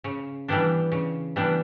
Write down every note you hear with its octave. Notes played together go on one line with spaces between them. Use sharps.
C#3
E3 G3 B3 D4
C#3
E3 G3 B3 D4